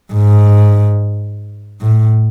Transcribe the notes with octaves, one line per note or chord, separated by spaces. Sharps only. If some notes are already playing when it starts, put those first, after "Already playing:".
G#2
A2